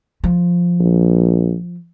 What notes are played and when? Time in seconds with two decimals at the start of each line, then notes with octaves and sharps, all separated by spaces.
0.24 F3
0.80 A#1